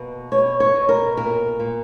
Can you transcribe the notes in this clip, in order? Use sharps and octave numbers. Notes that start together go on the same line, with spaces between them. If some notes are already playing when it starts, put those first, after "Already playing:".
Already playing: B2 A#3
B2 C#5
C#5
B2
A#4
A#2 A#4
A#2